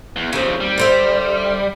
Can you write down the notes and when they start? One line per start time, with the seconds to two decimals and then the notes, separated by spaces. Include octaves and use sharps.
0.16 E2
0.33 D#2 C#3 F3 C4
0.61 G3
0.78 D3 C5 E5